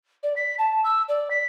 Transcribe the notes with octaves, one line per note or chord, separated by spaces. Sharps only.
D5
B6
A5
E6
D5
B6